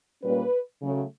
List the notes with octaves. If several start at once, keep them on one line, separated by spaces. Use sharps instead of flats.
A#2 G3 A#3 C#4 B4
C#3 F#3 A3